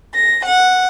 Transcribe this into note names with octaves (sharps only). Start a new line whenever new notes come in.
A#6
F#5